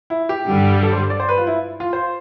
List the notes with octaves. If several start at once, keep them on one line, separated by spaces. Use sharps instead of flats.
E4
G4
G2 D3 G3
A4
C5
D5
C5
B4
F4
E4
F4
C5